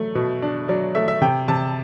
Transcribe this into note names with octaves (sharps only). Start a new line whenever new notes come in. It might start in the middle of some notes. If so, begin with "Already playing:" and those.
Already playing: F#3 A3
B2
D4
F#3 D5
A3 E5
E5
C3 G5
C3 A5